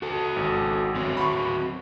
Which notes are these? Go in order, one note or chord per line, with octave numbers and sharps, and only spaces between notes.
F#4 A4
G#1
F#3 C4 F#4
B5 C#6